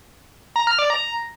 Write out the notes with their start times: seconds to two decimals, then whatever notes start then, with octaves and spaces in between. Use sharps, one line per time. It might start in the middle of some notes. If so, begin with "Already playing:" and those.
0.56 A#5
0.67 F6
0.79 D5
0.90 A#5